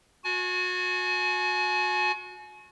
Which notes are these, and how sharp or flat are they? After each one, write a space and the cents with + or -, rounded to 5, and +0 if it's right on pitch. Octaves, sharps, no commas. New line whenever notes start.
F#4 -30 G#5 +35